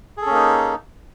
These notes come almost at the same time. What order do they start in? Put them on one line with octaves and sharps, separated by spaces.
G#4 A4 C#4 A#3 D#4